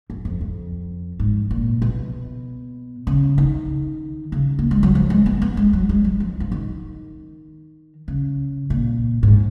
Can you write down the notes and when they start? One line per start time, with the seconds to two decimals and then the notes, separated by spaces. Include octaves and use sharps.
0.10 F#2
0.25 F2
0.41 F2
1.19 G#2
1.51 A#2
1.82 B2
3.07 C#3
3.38 D#3
4.32 C#3
4.59 A#3
4.71 G#3
4.83 F#3
4.95 F3
5.10 G#3
5.26 B3
5.42 B3
5.57 G#3
5.73 F#3
5.89 G#3
6.04 F#3
6.20 F3
6.40 F3
6.52 D#3
8.08 C#3
8.70 A#2
9.23 G#2